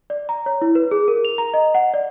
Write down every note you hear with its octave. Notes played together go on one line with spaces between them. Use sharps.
D5
A#5
C#5
E4
B4
G#4
A#4
F7
A#5
D#5
F#5
D5